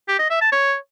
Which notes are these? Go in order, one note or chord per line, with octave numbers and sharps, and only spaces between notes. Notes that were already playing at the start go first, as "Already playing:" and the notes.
G4
D#5
E5
A5
C#5